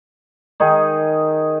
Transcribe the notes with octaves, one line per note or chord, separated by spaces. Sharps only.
D#3 D#4 G#4